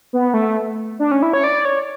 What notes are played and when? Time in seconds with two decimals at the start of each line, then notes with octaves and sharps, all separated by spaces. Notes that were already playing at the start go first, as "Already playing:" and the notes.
0.13 B3
0.34 A3
0.99 D4
1.12 C#4
1.22 E4
1.33 C#5
1.44 D5
1.65 C#5